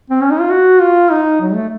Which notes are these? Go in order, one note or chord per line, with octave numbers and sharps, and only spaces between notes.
C4
C#4
D#4
F4
F#4
F4
D#4
F#3
A3